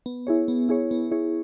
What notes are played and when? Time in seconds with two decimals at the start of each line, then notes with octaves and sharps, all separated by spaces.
0.06 B3
0.27 E4 G#4 C#5
0.48 B3
0.69 E4 G#4 C#5
0.91 B3
1.11 E4 G#4 C#5